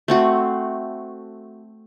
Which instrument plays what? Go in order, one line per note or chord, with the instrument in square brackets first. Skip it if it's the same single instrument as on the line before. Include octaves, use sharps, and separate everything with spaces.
[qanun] A3 C4 F#4